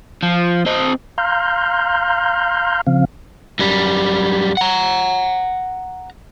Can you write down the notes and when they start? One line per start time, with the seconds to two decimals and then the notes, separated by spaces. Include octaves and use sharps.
0.23 F3
0.66 C4 D#5
1.18 F5 A#5 C6 F6 G6
2.87 C#3 F3 C4 F5
3.59 F#2 G3
4.57 F#5 A#5